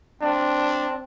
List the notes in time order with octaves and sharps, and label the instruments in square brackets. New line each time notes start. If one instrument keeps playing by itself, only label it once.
[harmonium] C4 [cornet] D4